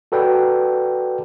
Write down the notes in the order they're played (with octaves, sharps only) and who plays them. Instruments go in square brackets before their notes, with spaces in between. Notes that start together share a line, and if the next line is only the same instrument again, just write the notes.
[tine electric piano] F#4 A4 B4 D5 G5